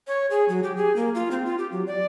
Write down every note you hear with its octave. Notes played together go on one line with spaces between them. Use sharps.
C#5
G#4
F#3
G4
G#4
A#3
F4
C4
F4
G4
F#3
D5